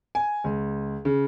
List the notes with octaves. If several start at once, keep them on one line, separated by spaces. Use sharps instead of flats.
G#5
C#2
C#3